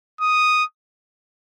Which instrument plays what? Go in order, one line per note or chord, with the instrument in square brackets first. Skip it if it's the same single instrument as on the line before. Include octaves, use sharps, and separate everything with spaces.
[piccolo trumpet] D#6